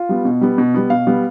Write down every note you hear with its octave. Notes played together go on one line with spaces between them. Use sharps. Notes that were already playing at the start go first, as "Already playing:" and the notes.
Already playing: F4
G3 B3
B2
G3 B3
B2
G3 B3
B2 F5
G3 B3